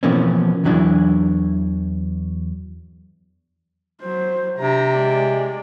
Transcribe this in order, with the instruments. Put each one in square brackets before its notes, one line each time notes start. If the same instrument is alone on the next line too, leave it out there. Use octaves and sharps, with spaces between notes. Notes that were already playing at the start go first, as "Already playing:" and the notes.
[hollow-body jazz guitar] B2 E3 F3 A#3 C4 C#4
E2 E3 F#3 D4 E4
[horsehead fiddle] F#3 C5
[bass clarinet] C3 [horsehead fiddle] D4 A#5
[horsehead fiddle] G#3 D5